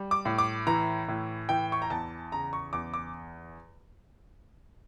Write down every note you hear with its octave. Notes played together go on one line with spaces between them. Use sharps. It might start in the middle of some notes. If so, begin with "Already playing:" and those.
Already playing: G3
D6
A2
D6
E3 A#5
A2
E3 G5
C#6
A#5
E2 A5
C#3 A#5
C#6
E2 D6
D6